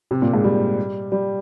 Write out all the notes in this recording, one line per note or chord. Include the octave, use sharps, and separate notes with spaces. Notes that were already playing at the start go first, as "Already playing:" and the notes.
C3
A#2
G#2
G3
G3